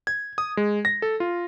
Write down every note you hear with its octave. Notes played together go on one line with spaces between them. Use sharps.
G#6
D#6
G#3
A#6
A4
F4